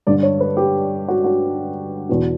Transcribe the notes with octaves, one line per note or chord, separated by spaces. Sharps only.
G2 D3 D5
C#5
B4
G4
F#4
F#4
E2 B2